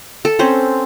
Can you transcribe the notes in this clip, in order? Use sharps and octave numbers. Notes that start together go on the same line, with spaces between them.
A4
C4 C#4 C5